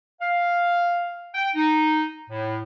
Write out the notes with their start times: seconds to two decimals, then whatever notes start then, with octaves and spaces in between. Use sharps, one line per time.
0.20 F5
1.35 G5
1.55 D#4
2.29 A2